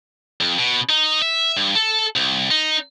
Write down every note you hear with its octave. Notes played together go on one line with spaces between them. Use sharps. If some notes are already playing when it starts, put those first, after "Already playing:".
F2
B2
D#4
E5
G2
A4
C2
D#4